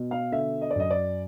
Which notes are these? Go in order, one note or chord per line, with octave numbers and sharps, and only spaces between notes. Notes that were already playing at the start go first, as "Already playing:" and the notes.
Already playing: B2
F5
D3 E5
D#5
D5
F#2 D#5
D5